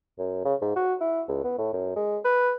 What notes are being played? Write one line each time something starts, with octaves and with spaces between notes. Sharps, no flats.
F#2
C#3
G#2
F#4
E4
C#2
B3
A2
F#2
G#3
B4